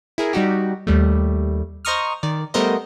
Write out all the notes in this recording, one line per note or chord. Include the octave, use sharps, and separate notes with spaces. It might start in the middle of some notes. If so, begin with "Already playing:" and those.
E4 G#4 A#4
G3 D#4 F#4 G4
D#2 G3 A3
C5 D#5 A#5 C#6 D#6 F6
D#3 D5
G3 A3 B3 A#4 C5 D#5